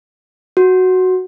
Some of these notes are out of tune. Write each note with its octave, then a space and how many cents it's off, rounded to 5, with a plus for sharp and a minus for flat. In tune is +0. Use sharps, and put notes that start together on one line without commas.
F#4 +0